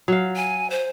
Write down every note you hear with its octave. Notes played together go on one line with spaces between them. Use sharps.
F#3 F5
G#5
C5